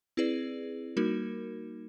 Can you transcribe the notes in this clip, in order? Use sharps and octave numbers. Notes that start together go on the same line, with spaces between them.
C4 E4 G#4 B4 D5
G3 A#3 D#4 F#4 A#4